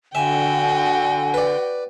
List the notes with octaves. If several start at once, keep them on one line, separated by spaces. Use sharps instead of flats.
D3 F#4 E5 G5 G#5
B4 D5